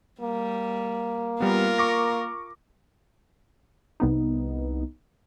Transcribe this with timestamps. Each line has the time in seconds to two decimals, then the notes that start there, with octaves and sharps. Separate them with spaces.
0.21 G3 A#3
1.40 G3 B3 F4 A#4
1.78 C#6 D6 A#6
4.00 C2 B3 D#4